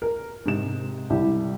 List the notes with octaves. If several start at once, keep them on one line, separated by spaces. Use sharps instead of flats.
A#4
G#2 C3 E7
C2 E4 G4